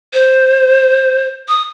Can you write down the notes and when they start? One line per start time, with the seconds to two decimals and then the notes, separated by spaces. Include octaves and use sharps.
0.13 C5
1.48 D#6